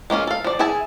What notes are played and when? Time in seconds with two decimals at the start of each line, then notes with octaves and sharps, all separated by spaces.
0.10 G#3 A#3 C#4 F4
0.27 A4 F5
0.44 F3 D5
0.59 E4 G#4 E5 G#5 A5